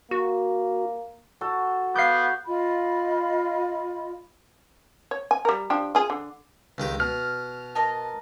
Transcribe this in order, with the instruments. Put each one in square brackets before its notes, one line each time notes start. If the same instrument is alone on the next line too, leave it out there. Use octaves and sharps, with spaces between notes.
[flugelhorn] A#3 [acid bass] F#4
[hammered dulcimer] F#4 A4
[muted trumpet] B3 [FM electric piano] F5 D6 [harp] G6 C7
[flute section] F4 D#5 B5
[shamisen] C#5
G#5
G3 A#4
F3 D4 G4
F4 G#4
D3
[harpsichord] C#2 D#3 G4
[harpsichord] B2 [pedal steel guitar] F6
[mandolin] A#4 D#5 A5